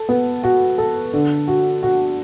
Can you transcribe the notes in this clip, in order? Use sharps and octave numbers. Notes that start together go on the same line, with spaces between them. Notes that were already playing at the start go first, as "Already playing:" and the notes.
Already playing: A4
B3
F#4
A4
D3
F#4
F#4